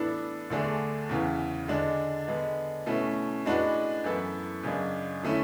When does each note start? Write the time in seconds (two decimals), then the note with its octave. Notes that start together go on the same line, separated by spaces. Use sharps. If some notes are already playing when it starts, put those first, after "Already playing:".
Already playing: A2 E3 B3 D4 A4
0.50 D2 D3 A3 D4 G#4
1.09 E2 C#3 E3
1.68 D3 G#3 D4
2.27 D3 G#3 B3
2.86 B2 A3 C#4 E4
3.46 A2 G#3 D4 F#4 B4
4.04 F#2 E3 B3 E4 A4
4.63 F#2 C#3 G#3 D4
5.23 D3 A3 C#4 E4